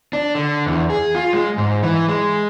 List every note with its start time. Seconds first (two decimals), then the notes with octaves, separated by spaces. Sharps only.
0.13 D4
0.35 D3
0.66 E2
0.90 G#4
1.15 F4
1.33 G#3
1.58 G#2
1.83 E3
2.08 G#3